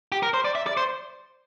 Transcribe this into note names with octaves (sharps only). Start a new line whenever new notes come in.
G4
A#4
C5
D5
E5
D5
C5